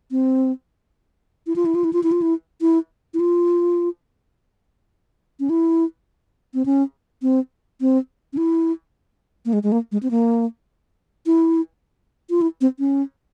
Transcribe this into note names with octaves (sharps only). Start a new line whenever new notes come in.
C4
E4
F4
E4
F4
E4
F4
E4
F4
E4
E4
E4
F4
C#4
E4
C4
C#4
C4
C4
C#4
E4
A#3
G#3
G#3
A#3
G#3
C4
A#3
E4
F4
E4
C4
C#4